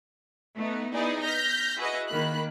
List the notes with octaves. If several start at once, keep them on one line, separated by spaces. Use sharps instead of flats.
A3 B3 D#4
B3 D#4 E4 G#4 D5 D#5
F6 G6 A#6 B6
E4 F#4 G#4 B4 D#5
D#3 A#3 B5 F#6